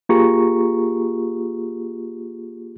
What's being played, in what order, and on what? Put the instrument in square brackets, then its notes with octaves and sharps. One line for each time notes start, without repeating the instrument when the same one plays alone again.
[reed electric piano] A#3 F4 G4 G#4 A#5 C#6